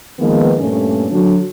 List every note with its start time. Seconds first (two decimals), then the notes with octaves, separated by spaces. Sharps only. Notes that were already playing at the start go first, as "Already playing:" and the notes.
0.19 D#3 F3 G#3 A#3 B3
0.59 G2 A#2 A3 C#4
1.11 D3 F#3 D4